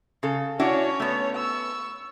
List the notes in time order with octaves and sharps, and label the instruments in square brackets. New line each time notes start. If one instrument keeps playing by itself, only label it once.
[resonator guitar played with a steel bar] C#3 A4
[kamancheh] C#4 C#5 [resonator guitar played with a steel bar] D4 E4 F#4
[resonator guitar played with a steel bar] A3 B3
[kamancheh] C#6 E6